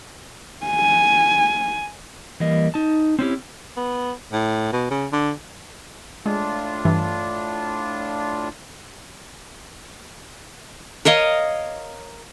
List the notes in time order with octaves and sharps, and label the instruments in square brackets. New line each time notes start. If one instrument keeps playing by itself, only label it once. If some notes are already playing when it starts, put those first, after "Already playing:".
[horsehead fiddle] G#5
[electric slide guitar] E3 G3 A#3 D#5
D#4 A5
C4 C#4 E4 G4
[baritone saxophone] B3
A2
B2
C#3
D3
[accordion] A2 D4 F4 [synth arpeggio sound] G#3
[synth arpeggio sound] G2 E3
[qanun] A#4 C#5 D#5 F5